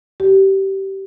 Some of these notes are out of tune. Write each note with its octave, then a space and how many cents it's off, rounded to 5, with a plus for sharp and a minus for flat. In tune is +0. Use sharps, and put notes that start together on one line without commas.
G4 -20